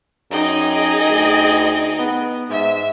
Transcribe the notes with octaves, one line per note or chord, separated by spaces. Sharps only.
F#2 D#4 G#4 D#5 G5
D2
B3
G#2 E5